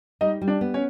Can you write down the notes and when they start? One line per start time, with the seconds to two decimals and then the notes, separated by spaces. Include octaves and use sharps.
0.21 G3 D#4 D#5
0.41 G3
0.48 D4 D5
0.61 B3
0.74 C#4 C#5